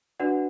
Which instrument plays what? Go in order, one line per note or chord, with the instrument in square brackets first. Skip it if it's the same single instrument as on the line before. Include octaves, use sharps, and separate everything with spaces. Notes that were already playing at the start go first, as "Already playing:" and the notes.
[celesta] D4 F#4 B4 D5 F#5